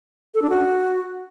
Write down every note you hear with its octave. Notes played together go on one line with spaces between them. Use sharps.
A4
D4
F#4